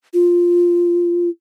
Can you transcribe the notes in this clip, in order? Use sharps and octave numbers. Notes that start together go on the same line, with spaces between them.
F4